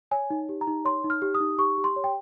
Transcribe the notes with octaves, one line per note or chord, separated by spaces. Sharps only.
C#5 G#5
D#4
G4
A#5
D#4
C#5 C6
D#4
F6
G4
D#6
D#4
G4 C#6
G4
C6
C#5
G5